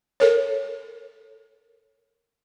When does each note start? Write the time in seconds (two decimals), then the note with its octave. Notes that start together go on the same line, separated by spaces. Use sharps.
0.20 A4 A#4 C#5